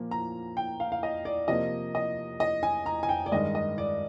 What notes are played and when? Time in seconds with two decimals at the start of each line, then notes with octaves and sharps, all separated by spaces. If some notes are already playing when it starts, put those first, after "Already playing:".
Already playing: A#2 F3 A#3
0.11 A#5
0.57 G5
0.80 F5
0.92 F5
1.03 D#5
1.25 D5
1.48 C3 F3 A#3 D#5
1.95 D#5
2.40 D#5
2.63 G#5
2.86 A#5
3.03 G#5
3.09 G5
3.26 D5
3.32 G2 D#3 G#3 D#5
3.55 D#5
3.78 D5